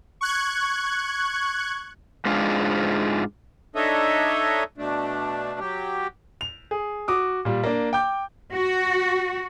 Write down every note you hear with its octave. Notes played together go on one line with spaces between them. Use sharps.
C#6 F#6 G#6
G#2 G#3 D4 F4
D4 D#4 A4 C#5 D#5 E5
B2 A3 D4
F#3 G4
F7
G#4
F#4 D6 D#6
A#2 G3
A#3 D4
G5 D6 G6
F#4